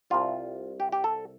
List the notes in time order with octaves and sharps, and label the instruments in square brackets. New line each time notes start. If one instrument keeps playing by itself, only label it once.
[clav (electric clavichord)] C2 C3 G3 F4
G4
G4
A4